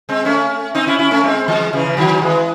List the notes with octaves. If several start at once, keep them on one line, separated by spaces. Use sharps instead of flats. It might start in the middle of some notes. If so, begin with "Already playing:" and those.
G#3 C4
A3 C#4
C4 D#4
C#4 E4
C#4 E4
A3 C#4
G#3 C4
E3 G#3
C#3 E3
E3
D#3 F#3
E3 G#3